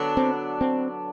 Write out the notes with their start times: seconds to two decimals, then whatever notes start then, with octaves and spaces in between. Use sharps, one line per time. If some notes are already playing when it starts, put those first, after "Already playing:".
Already playing: D3 F#3 B3 D4
0.17 C4
0.61 C4